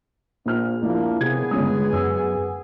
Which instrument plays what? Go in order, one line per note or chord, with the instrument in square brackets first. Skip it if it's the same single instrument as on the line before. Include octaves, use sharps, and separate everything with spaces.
[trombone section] A#1 [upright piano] A#2 F6
[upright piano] A#1 F3 E4 [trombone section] A#3 D4
[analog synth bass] C3 [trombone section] B3 G#4 [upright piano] G#6
[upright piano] G1 C#4 D#6 [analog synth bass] G#3
[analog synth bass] F#2 [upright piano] E6